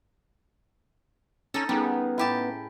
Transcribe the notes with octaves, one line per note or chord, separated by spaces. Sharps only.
C#4 D#4 A4
G3 B3 C#4 D#4 G#4 A#4
A2 E4 G4 A5